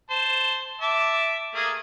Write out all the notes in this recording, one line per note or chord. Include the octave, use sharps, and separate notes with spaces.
C5 A5
E5 A5 D6
A3 A#3 G#4